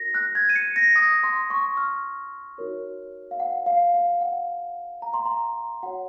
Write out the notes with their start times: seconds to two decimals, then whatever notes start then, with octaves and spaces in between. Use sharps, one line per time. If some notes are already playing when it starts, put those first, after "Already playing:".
Already playing: D#4 F#4 A#4 A#6
0.14 F#6
0.35 G#6
0.49 D#7
0.56 C#7
0.76 A#6
0.96 D#6
1.23 C6
1.50 C#6
1.77 F6
2.58 D#4 F#4 A#4 C#5
3.31 F5
3.40 F#5
3.66 F5
3.94 F5
4.21 F#5
5.02 A#5
5.14 C6
5.25 A#5
5.83 F#4 C#5 F#5